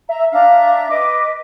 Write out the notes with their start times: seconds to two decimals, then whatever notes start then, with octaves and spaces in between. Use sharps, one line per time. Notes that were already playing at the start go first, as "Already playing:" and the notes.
0.09 E5 A#5
0.32 D4 E5 F5 A#5
0.89 B4 D#5 D6